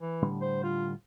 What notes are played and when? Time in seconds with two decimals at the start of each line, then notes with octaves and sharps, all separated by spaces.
0.01 E3
0.22 A2 D3 G3
0.41 C5
0.63 F4